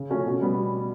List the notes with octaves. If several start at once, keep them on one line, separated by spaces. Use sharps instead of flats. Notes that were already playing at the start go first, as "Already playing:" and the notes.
Already playing: C#3
F3 A3 C#4 F#4
B2
G3 B3